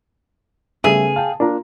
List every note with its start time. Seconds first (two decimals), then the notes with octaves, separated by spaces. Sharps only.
0.84 C#3 G3 A3 B3 G#4 E5
1.16 F5 G5 A5
1.40 A#3 D4 F4 A#5